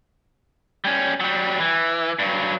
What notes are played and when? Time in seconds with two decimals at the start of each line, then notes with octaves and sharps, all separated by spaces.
0.85 G3 C#4
1.20 F#3 G3
1.60 E3
2.19 G2 F#3